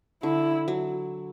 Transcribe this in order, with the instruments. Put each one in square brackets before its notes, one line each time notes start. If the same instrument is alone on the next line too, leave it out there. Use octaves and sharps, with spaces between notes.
[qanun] D3 [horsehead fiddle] E4
[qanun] F#3